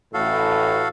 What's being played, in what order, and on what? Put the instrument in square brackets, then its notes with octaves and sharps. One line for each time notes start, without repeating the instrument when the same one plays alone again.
[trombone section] A1 A2 [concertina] F#4 A4 F5